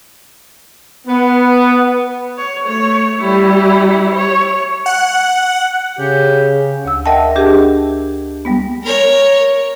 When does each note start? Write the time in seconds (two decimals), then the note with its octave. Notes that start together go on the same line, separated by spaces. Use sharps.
1.06 B3
2.38 C#5
2.66 A3 C#5
3.20 G3 E4
4.15 C#5
4.86 F#5
5.99 C#3 G4
6.85 D2 E6
7.06 A#4 D#5 E5 F#5 G5 A5
7.35 D4 G4 G#4
8.45 G3 G#3 B3
8.83 A#4 C#5